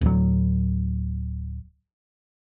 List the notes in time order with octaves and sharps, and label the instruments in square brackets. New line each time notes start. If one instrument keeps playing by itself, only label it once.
[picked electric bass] D1 F#3